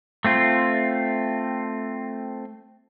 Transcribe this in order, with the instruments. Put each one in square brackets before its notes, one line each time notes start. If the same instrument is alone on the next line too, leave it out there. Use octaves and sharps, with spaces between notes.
[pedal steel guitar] A3 C4 F4